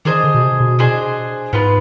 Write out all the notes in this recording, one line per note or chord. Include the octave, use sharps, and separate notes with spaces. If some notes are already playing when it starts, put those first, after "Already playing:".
D#3 D4 G#4 C5 D#5
D3
B2
C3
B2
D4 G#4 C5 D#5
G#2 B3 F4 B4